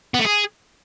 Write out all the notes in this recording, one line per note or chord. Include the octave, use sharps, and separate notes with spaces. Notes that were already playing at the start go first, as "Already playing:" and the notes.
B3
A3
G#4